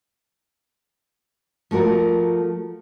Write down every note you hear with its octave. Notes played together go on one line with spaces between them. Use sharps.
F3 A3 F#4 A#4